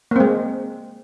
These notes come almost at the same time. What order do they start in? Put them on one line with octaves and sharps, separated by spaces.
A#3 C4 G#3